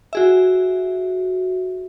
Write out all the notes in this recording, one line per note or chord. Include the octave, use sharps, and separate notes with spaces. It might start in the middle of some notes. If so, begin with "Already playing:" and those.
F#4 G#4 E5